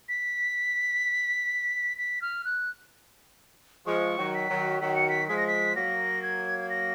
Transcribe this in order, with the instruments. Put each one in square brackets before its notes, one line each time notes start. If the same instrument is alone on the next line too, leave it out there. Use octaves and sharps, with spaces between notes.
[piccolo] B6
B6
F6
F#6
[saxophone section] F3 G#3 [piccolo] C#6
[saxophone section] D#3 F#3
[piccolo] B6
[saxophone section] D#3 F#3
[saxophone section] D#3 F#3 [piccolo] B6
[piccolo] C#7
B6
[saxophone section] F3 G#3 [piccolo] B6
[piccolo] A#6
B6
[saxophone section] F#3 A#3 [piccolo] A#6
[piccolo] G#6
G#6
A#6